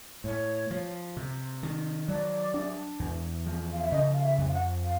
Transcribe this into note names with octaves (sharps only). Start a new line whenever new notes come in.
A2 C#5
F3
C3
D#3
F#3 D5
D4
E2
F3
F5
E5
C#3 D#5
F5
E5
F2
F5
F#5
F5